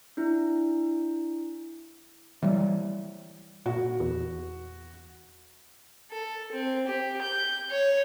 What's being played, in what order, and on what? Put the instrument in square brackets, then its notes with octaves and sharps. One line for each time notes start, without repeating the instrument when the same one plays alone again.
[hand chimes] D4 E4
[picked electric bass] E3 G3
[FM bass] A#2 [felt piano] F#4
[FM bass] E2
[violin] A4
C4
G4
G6
C#5